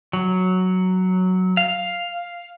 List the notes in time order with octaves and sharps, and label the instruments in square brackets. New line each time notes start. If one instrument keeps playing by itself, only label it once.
[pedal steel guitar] F#3
F5